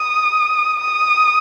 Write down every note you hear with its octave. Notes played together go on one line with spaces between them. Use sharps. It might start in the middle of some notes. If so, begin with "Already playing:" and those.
Already playing: D#6
D#6